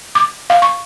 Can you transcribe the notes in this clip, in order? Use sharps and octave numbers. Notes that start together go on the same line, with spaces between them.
D6
F5
C#6